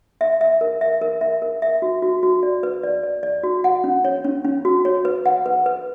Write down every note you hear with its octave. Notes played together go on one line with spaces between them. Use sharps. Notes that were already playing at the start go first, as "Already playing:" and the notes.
E5
E5
A#4
E5
A#4
E5
A#4
E5
F#4
F#4
F#4
D5
B4
D5
D5
D5
F#4
F#5
C#4
C#5
C#4
C#4
F#4
C#5
B4
F#5
B4
B4